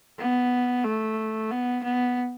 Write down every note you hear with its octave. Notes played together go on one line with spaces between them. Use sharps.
B3
A3
B3
B3